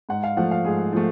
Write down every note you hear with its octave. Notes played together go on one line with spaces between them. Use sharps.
G#2 F#5
F5
F3 A3 F#5
F5
G#2 G#4
F3 A3